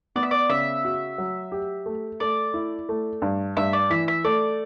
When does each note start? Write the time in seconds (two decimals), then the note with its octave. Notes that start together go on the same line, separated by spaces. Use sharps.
0.16 B3 D5
0.23 E5
0.31 D5
0.49 C#3 E5
0.84 F#4
1.18 F#3
1.52 G4
1.86 A3
2.20 A3 D5
2.54 E4
2.89 A3
3.22 G2
3.57 G2 E5
3.73 D5
3.90 E3 E5
4.08 E5
4.24 A3 D5